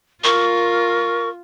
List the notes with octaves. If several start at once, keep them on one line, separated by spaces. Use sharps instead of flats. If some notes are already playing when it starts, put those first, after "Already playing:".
F4 A#4 C#6